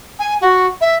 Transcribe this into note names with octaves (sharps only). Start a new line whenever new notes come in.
G#5
F#4
E5